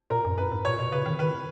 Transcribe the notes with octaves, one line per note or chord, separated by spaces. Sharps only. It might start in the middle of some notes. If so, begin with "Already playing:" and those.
A#2 A#4
F#2
F#2 B4
G#2
A#2 C#5
B2
C#3 B4
D#3
D#3 B4